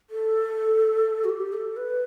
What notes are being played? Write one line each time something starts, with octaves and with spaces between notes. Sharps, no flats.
A4
F#4
G4
A4
B4